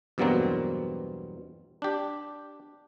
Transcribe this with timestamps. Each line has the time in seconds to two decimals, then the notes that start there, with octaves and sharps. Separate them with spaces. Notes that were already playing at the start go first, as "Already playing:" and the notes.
0.18 E2 G2 B2 F#3 A#3 C4
1.82 D4 G4